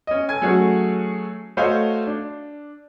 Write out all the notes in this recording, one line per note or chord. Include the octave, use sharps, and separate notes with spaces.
C#4 D#5
A4 G#5 G#6
F#3 A3 C#4 F#4 G#4
A3 F#4 C5 C#5 D#5 F5
D4